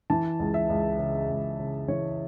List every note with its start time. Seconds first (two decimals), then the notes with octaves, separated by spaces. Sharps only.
0.10 E3 A5
0.39 C#2
0.54 E5
0.70 C#2
0.99 C#3
1.29 C#2
1.59 C#3
1.88 E3 C#5